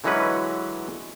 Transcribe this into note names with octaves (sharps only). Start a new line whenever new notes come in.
D3 E3 F#3 G#3 C#4 B4